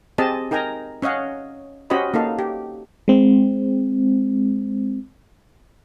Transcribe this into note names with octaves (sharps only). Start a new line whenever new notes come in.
C4 G4 G#4 D#5 A5
D#4 A#4 G5 G#5 A#5
C#4 C#5 D#5 F5 F#5
C#4 F#4 G4 C5 D#5 B5
A#3 D#4 A4 F5
G4
G#3 C4